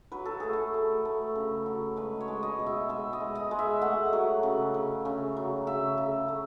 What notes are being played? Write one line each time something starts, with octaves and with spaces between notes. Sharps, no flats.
F#3 B4
A4
A3 G#4
A4
A3
A3
C#3
F#3
G#3 B4
C#5
G#3
D#5
B2
E5
G#3 E5
D#5
G#3
D#5
G#3
E5
A3 F#5
F#3
C#3
C#3
C#3
F#3
C#3 E5
C#3
A3